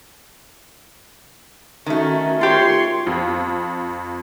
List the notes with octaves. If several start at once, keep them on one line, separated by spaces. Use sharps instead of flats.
D#3 A3 C#4 F#4
F4 G4 C#5 C6
F2